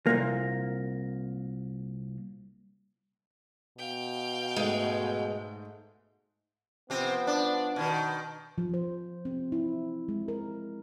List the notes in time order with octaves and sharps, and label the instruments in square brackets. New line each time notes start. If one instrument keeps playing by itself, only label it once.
[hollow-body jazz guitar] C2 A#2 A#3
[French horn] B2 [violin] F5 G5
[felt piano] G#2 A3 [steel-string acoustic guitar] G#3
[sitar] C3 C4 [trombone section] F3 B3
[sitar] D4
B2 D#3
[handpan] F3
C5
C4
E4
G#3
A#4